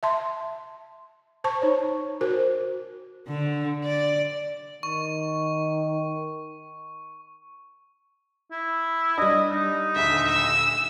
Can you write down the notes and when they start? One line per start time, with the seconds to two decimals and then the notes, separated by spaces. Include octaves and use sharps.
0.03 E5 A5 C6
1.44 C5 A5 C#6
1.62 D#4 C#5
2.21 F#4 A#4 C5
3.28 D3
3.84 D5
4.83 D#3 C#6
8.51 E4
9.18 G3 D4 D#5
9.51 D#4
9.96 D#1 D2 E5
10.31 E6